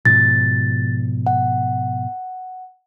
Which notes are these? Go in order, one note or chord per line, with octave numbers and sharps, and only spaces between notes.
G#2 B2 F3 A6
F#5